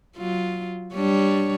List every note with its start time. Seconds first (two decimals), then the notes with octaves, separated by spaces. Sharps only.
0.16 F#3 F4
0.95 G3 D4 C#5